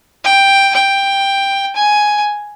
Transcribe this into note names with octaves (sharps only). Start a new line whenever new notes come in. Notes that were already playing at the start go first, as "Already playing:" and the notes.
G5
G5
G#5